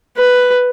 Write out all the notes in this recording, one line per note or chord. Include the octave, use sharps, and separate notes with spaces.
B4